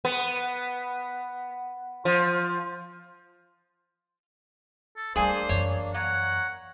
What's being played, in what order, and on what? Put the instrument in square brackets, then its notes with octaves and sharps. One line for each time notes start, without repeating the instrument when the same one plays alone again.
[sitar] B3
F3
[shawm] A4
[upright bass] G3 A3 [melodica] A#3 D4 [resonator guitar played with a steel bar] G#4 G#5 [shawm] C5
[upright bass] F#2 E3 [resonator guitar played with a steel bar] C#5
[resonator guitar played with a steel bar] A#3 [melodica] C#5 A#5 [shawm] F#5